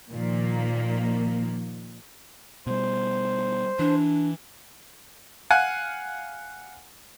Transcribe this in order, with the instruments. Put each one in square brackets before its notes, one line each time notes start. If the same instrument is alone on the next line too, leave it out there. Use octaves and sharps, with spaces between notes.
[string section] A#2 D#3 F3 A#3
[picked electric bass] B2 G3 [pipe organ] C5
[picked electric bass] E3 [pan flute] D4
[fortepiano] F5 F#5 G#5